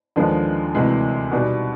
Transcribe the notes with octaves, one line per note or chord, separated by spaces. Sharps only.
D#2 D3 F3 G#3 B3
D2 C3 E3 G#3
B2 G3 B3 D#4